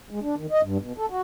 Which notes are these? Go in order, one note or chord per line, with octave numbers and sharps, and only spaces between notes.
G#3
D4
D#3
D#5
G2
B2
A4
F#4